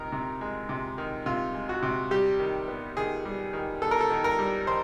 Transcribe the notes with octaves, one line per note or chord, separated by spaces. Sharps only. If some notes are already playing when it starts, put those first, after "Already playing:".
Already playing: C3 D#3 A#4
C3
G#3
C3
D#3
C3 F4
G#3
F#4
C3
G3 G4
D#3
B3
D#3 G#4
G3
D#3
B3 A4
A#4
A4
D#3
A#4
G3
D#3 C5